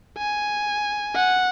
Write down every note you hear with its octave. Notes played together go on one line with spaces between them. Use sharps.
G#5
F#5